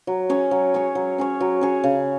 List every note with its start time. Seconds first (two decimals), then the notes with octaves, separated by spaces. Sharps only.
0.07 F#3
0.29 C#4 G#4 C#5
0.51 F#3
0.74 C#4 G#4 C#5
0.95 F#3
1.18 C#4 G#4 C#5
1.40 F#3
1.61 C#4 G#4 C#5
1.84 C#3